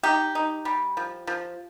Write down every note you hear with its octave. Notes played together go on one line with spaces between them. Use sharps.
D#4 G4
D#4
G3
F3
F3